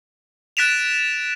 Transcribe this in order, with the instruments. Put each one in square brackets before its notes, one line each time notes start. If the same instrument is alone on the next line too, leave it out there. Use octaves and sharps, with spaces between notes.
[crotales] F#6 A6 B6 D7 E7 F7